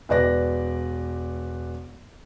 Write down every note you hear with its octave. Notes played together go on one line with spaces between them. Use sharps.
E1 B4 D5 A#6